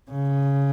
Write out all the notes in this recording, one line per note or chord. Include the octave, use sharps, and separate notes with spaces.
C#3